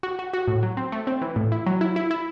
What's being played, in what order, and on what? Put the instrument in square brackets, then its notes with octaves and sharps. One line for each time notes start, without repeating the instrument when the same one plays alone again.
[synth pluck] F#4
F#4
F#4
A2
F#3
C4
A3
C4
E3
A2
E4
F#3
E4
E4
E4